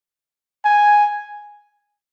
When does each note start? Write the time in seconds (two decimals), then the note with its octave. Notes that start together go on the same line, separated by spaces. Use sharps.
0.65 G#5